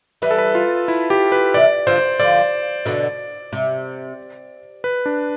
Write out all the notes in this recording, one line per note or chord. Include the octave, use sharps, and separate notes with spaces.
E3 G3 B4
A4
B4
F4
E4
G4
B4
C3 E3 D5
D3 F3 C5
D3 F3 D5
B2 D3
C3
B4
D4